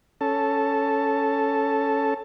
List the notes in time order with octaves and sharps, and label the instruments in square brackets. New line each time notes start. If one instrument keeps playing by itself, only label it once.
[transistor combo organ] C#4 A4 A5